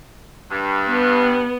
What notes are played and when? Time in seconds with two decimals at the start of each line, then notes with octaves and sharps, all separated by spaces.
0.51 G2
0.87 B3